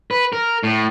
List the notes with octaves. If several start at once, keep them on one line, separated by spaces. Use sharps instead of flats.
B4
A#4
A2